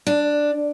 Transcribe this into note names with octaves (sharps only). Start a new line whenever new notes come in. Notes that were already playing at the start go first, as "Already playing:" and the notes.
D4